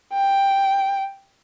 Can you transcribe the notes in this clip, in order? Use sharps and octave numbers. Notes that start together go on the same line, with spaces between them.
G5